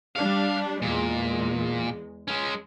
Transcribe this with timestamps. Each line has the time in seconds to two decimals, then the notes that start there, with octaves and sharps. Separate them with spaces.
0.16 G3 D4 F5
0.82 E2 A#2 G#3
2.28 G#3 C#4